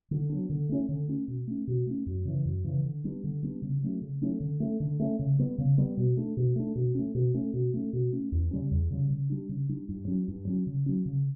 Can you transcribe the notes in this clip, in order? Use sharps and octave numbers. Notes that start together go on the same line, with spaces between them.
D3
F#3 B3 D4
D3
A3 C#4
D3
A3 C#4
B2
A3 C#4
B2
A3 C#4
F#2
C#3 E3
F#2
C#3 E3
D3
G3 B3 D4
D3
G3 B3 D4
C#3
F#3 A3 C#4
C#3
F#3 A3 C#4
D3
A3 C#4
D3
A3 C#4
C#3
G3 B3
C#3
G3 B3
B2
A3 D4
B2
A3 D4
B2
A3 C#4
B2
A3 C#4
B2
A3 C#4
B2
A3 C#4
E2
C#3 G3 C#4
E2
C#3 G3 C#4
C#3
G3 D4
C#3
G3 D4
G2
F#3 C#4
G2
F#3 C#4
C#3
F#3 C#4
C#3